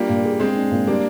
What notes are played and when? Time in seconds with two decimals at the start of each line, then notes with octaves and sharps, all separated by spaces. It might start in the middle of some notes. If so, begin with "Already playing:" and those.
Already playing: G3 A#3 D4 F4
0.09 A#2
0.24 G#4
0.39 G#3 C4 G#4
0.56 D4
0.71 A#2
0.87 G3 A#3 D4